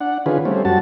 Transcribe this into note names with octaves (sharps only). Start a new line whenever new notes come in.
D4 F#5
D3 D#3 C#4 F4 G#4 B4
G3 A3 C4 C#4
F#2 G3 F#4 A5